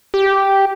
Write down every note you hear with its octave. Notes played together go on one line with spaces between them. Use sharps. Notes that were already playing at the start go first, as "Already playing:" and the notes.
G4